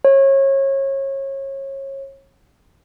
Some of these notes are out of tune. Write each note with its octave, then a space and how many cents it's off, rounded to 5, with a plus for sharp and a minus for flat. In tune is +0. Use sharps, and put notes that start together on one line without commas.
C#5 -30